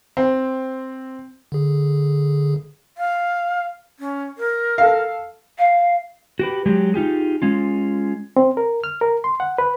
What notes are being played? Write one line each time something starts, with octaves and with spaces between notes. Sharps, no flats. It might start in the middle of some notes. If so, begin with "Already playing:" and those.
C4
D3 G#4
F5
C#4
A#4
A4 F5
F5
F#4 G4 B4
F#3 G#3 G4
D#4 F4 G4 G#4
G#3 C#4 F4
C4
A#4
F6
A#4
C6
F#5
B4